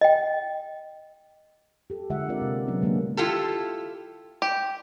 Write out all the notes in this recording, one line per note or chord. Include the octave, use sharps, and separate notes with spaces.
D#5 G5
G4 A4
D3 G#3 F4 E5 F#5
C4 F4 A#4 D5
C3 A#3
F#3 B3 C#4
D3 G#3 A#3 D4 A#4
E4 F4 G4 A4
G4